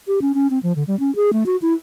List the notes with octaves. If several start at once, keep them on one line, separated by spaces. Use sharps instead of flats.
G4
C#4
C#4
C4
F3
D3
G3
C#4
G#4
A3
F#4
E4